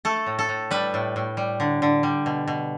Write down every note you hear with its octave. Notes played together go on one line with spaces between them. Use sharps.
A3 A4
A2
A4
A2
G3 B4
A2
A2
G3
D3
D3
G3
B2
B2